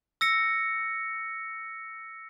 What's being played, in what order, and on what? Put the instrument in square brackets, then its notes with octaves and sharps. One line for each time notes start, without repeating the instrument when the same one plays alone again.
[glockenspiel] E6 A#6 C#7